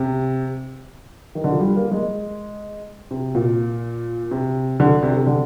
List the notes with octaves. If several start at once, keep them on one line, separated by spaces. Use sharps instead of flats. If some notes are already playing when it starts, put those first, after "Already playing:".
Already playing: C3
D#3
D3
F3
G3
A#3
G#3
C3
A#2
C3
D3
C3
C3
D3